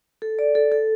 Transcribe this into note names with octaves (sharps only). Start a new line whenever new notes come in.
A4
D5
A4
A4